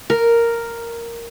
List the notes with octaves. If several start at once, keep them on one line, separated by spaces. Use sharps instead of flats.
A#4